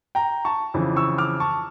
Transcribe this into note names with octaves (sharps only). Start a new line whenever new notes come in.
G5 A#5
A5 C#6
F2 C#3 E3
C#6 E6
D6 F6
A5 C#6